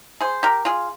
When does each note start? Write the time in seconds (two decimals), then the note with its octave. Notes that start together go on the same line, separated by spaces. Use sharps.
0.21 G#4 C5
0.43 G4 A#4
0.65 F4 G#4